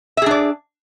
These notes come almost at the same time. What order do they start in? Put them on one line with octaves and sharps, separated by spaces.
E5 G#4 D4 D5